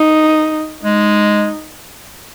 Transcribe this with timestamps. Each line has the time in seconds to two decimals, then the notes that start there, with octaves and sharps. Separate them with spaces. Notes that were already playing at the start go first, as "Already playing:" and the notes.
Already playing: D#4
0.83 G#3 D#4